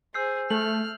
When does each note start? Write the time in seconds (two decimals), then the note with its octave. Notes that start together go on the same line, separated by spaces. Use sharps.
0.14 G#4 C5 E6 G6 C7
0.50 A3 F6 F#7